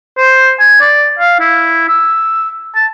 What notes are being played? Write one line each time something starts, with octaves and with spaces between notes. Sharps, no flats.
C5
G#5
D5
F5
E4
E6
A5